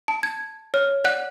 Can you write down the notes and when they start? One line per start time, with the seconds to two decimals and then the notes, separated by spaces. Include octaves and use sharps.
0.08 A5
0.23 G#6
0.74 C#5 F6
1.04 D5 F#5 F#6